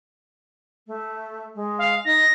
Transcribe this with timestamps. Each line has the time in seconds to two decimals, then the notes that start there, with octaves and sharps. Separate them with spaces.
0.87 A3
1.55 G#3
1.78 F5
2.05 D#4 A#6